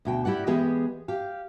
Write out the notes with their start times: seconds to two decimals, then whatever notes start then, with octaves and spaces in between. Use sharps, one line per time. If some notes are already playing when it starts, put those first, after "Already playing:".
0.05 D2 B2 G5
0.25 E4 G4 D5 F#5
0.47 E3 G#3 B3 G4 G#4
1.08 G4 F5